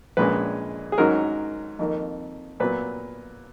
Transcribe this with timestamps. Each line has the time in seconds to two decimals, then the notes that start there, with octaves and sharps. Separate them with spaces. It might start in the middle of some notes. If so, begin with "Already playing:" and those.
0.17 A#1 A#2 G#3 C#4 B4
0.92 G#4
0.98 G#2 D#3 F#3 C#4 A#4
1.79 F2 D#3 A#3
2.60 A#2 F#3 B3 B4